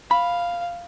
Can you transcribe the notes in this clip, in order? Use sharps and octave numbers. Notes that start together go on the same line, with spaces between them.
F5 B5